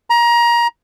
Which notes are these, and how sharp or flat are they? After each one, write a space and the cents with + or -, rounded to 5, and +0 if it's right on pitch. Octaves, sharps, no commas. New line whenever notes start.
A#5 +25